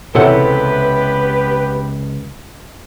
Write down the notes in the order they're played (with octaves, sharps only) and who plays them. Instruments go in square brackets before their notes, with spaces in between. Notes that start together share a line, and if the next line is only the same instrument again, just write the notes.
[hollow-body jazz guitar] C#2 A4 F#5 [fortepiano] C3 E3 [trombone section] B3 G4 B4